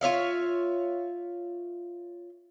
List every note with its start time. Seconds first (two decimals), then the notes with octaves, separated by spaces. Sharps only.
0.01 F4 C#5 E5 F5